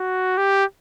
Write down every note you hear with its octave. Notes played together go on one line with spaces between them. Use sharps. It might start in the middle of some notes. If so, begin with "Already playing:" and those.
Already playing: F#4
G4